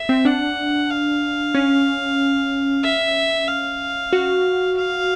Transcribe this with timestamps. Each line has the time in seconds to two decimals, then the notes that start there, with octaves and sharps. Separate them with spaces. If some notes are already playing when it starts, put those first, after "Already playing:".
Already playing: E5
0.09 C4
0.25 D4 F#5
0.90 F5
1.55 C#4
2.84 E5
3.48 F5
4.13 F#4
4.77 F5